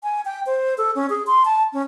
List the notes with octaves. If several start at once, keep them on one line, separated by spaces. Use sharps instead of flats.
G#5
G5
C5
A4
C#4
G#4
C6
A5
C#4